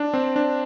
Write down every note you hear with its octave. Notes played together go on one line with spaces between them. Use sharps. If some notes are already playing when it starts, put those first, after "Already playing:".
Already playing: D4
C4
D4